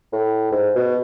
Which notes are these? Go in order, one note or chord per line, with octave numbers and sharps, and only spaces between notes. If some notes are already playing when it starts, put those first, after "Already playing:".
A2
G#2
B2